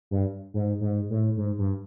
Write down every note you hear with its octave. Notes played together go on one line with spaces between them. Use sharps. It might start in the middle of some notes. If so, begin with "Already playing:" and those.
G2
G#2
G#2
A2
G#2
G2